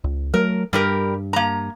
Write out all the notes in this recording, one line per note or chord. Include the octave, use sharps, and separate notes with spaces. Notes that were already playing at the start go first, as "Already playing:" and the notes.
C#2
F#3 A3 A#4
G2 G3 G4 A#4
A#3 A#5